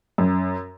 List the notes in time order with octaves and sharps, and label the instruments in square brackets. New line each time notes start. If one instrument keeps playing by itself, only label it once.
[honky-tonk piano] F#2